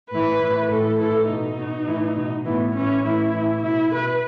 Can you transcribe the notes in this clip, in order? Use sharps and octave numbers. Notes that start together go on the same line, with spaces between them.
A2 E3 B4
A2 E3
A2 E3 A4
A2 E3 A4
B2 D#4
B2
A2 E3
B2
A2 E3 B3
A2 E3 C#4
A2 E3 E4
A2 E3
B2 E4
B2 B4